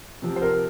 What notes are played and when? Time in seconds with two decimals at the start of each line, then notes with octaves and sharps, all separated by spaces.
0.22 C3 F3 C4
0.36 C5
0.42 A#4